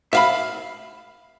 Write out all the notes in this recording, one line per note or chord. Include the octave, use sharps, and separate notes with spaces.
E5 F5 B5